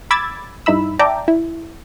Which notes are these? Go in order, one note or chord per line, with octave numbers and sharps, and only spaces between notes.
B5 D6 E6 G#6 A6
G2 D#4 E4 B5 E6
D5 E5 G5 A5 A#5 D6
E4